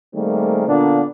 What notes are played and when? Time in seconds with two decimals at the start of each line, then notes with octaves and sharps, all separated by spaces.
0.14 D#3 G3 A3 A#3 C4 G#4
0.67 A#2 D3 A#3 B3 D4 F4